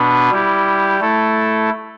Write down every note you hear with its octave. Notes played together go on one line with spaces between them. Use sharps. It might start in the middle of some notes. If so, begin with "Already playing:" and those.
Already playing: B2 B3 D4 B4
G3 E4 G4
A3 E4 A4